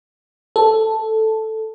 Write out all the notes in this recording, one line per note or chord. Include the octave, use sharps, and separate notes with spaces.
A4